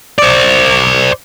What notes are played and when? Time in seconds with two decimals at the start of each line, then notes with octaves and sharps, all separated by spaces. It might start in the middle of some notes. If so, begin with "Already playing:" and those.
0.18 C5 D5